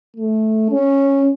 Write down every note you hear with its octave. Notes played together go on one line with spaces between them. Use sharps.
A3
C#4